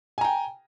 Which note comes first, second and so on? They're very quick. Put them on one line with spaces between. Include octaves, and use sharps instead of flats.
G#5 A#5 G5